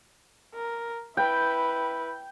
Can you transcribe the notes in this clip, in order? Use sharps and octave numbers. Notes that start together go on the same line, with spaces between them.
A#4
E4 B4 G5